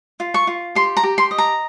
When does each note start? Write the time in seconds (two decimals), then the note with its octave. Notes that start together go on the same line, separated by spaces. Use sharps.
0.20 F4
0.34 C#6
0.47 F4
0.75 G4 C6
0.97 A#5
1.03 G4
1.18 C6
1.31 D#5
1.38 A#5